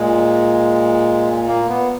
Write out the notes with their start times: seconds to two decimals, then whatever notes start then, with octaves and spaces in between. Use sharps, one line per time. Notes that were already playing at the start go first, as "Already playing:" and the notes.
Already playing: A#2 G#3
1.48 A#3
1.69 B3